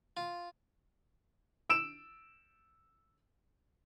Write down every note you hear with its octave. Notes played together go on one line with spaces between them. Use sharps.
F4
E6 D7 E7